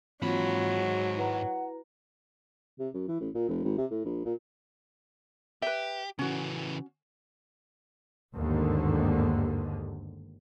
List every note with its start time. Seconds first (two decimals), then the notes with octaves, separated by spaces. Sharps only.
0.22 G#2 E3 F#3 A#3 C4 F4 B5
0.76 G#4
1.16 E4 B4 F#5 A#5
2.79 C3
2.94 F#2
3.08 E3
3.20 A1
3.35 A#2
3.49 F1
3.64 G#1
3.78 C3
3.91 A2
4.05 A#1
4.25 A#2
5.62 G4 B4 E5
6.19 C#3 E3 C#4 F#4
8.33 G1 D#2 G#2 D3 D#3